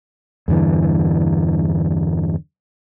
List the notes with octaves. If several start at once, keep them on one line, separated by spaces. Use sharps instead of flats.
E2 G2 D3 E3